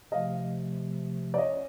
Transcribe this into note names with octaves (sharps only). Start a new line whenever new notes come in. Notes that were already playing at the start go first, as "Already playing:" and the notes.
C3 F3 A3 D#5 F5
D5
C#4 C#5 D#5